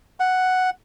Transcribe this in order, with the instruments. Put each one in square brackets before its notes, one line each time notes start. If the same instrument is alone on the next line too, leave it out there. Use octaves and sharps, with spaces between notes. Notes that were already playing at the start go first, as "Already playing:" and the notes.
[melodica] F#5